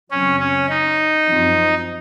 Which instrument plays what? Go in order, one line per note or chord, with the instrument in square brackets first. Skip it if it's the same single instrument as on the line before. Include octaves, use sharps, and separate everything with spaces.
[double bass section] F#2 C#3 F#3 C4 [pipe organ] C#4
[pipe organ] C#4
D#4
[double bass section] F#2 F3 C4